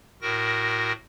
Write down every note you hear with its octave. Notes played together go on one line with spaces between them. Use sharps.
A2 F#4 A#4 A#6